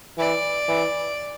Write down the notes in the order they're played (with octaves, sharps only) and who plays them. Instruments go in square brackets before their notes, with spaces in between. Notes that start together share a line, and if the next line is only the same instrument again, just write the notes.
[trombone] E3 [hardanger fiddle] D5
[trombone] E3